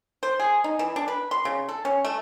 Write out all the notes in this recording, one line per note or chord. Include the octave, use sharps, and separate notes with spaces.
C5
G#4
D#4
E3
D4
B4
C6
C#3
A4
C#4
A3